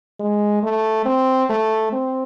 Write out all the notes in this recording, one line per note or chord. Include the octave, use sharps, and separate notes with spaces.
G#3
A3
C4
A3
C4